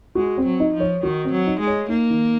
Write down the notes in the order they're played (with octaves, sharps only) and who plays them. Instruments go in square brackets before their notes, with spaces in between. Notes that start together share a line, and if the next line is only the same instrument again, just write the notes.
[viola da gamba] G#3 [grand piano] F#4
[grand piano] C4
[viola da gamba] F#3
[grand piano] D#4
[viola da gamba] F3
[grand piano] C#5
[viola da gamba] D#3 [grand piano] F#4
[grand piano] C4
[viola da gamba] F#3
[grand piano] D#4
[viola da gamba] G#3
[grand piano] C#5
[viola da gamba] A#3 [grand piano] D#4
[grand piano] D#3